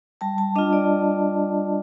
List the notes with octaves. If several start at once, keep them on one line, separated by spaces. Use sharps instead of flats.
G3 A5
A5
D4 F4 D#5
D5